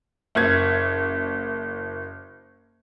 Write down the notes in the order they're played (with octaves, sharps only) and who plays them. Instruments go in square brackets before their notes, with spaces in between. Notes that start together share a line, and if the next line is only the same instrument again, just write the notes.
[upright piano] F#1 G#6 [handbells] A#4 E5